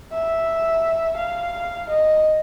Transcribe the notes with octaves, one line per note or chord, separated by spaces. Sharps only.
E5
F5
D#5